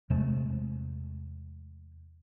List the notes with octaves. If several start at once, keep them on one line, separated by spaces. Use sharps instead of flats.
E2 C3 G#3 A3